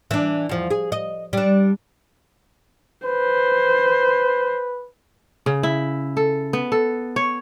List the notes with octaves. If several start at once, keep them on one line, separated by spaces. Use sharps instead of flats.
E3 D4
E2 F3
G#4
D#5
G3 D4
B4 C5
C#3
E4
A4
B3
A4
C#5